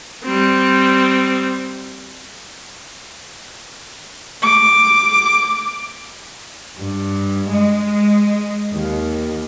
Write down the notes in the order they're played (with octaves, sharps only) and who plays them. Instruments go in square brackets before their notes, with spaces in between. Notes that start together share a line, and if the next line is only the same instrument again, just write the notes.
[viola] G3 C4
D6
[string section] G2
G#3
D#2